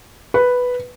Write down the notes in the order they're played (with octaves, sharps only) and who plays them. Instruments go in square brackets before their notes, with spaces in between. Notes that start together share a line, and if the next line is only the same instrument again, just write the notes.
[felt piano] B4